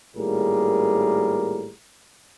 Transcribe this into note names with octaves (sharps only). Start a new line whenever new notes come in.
G#1 A2 G3 A#3 G#4 A#4